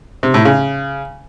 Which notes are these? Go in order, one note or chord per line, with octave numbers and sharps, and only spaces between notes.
C3
A2
C#3